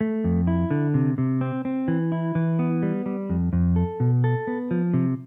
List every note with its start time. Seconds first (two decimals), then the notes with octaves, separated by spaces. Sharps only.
0.01 A3
0.24 F2
0.47 E4
0.71 D3
0.94 C3
1.18 C3
1.41 C4
1.65 C4
1.88 E3
2.12 E4
2.35 E3
2.59 B3
2.83 G3
3.06 G3
3.30 F2
3.53 F2
3.76 A4
4.00 B2
4.24 A4
4.47 B3
4.71 F3
4.94 C3